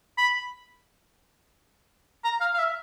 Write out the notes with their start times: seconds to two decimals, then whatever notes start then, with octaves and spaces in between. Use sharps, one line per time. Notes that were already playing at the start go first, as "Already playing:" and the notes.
0.18 B5
2.24 A#5
2.40 F5
2.54 F5
2.59 E5